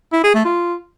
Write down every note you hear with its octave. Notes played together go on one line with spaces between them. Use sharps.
E4
G#4
A3
F4